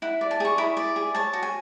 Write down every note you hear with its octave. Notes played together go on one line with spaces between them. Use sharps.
E4 F#5
D5
A5
G#4 C#6
E4 B5
D5
G#4
C#5 A5
F#4
G#5